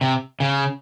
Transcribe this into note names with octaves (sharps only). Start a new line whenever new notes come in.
C3
C#3